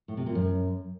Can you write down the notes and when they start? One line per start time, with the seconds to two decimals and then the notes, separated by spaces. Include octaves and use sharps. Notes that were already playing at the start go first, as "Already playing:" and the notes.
0.08 A2
0.17 C3
0.26 A#2
0.35 F#2